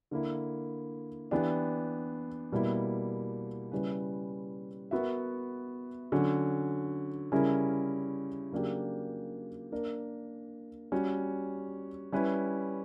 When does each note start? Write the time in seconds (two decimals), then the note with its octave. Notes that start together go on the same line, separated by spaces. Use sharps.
0.11 D3 A#3 E4
1.31 E3 B3 D4 G4
2.52 B2 G3 A#3 E4
3.72 C#3 G3 C#4 E4 B4
4.91 B3 F#4 A#4 E5
6.12 D3 F#3 C#4
7.32 C#3 G3 C#4 E4 A#4
8.52 C#3 F#3 A#3 D4 G4
9.72 A#3 D4 A#4
10.92 G3 C#4 F#4
12.12 G3 C#4 E4 B4